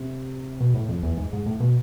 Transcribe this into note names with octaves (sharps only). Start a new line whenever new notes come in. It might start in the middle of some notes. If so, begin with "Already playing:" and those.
Already playing: C3
B2
A2
F2
E2
G#2
G#2
A2
B2